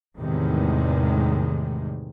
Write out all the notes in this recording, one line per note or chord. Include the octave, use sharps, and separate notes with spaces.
E2 A2 C3 D#3 G#3